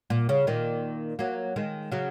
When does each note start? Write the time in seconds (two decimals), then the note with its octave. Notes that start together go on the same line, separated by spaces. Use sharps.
0.10 A#2
0.29 C#3
0.47 A#2 D#3
1.19 F#3 A#3
1.56 D#3 G#3
1.92 C#3 F#3